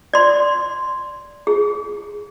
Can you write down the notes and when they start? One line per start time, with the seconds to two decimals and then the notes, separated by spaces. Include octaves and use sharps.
0.13 D5 C6
1.47 G#4